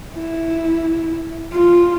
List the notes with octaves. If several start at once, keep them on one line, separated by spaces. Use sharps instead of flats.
E4
F4